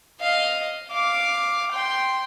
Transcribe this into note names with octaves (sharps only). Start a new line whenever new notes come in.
D#5 F5
F5 D6
G5 C6